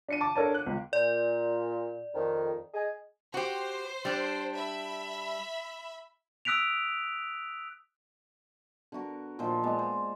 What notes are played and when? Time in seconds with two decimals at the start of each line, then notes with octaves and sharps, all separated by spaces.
0.08 D4 C#7 D#7
0.21 A5 D6
0.36 D4 A4 A#4 C#5 A5
0.54 F#6
0.67 C#2
0.93 A#2 D5
2.14 F2 D#3
2.74 G#4 D#5 G#5
3.34 F#4 G4 C5
4.05 G3 D4
4.54 E5 B5
6.45 D#6 E6 F#6 B6 D7 F7
8.92 D3 B3 F#4 A#4
9.39 A#2 D#3 F3 C5
9.63 G#3 B3 D5
9.79 C5